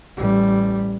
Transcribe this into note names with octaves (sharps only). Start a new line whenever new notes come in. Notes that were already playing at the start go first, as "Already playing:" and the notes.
A1 G3